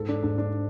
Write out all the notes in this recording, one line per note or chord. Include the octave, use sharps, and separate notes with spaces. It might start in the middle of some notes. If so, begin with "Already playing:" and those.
Already playing: G#2 A4
D4
G#2 D4
D4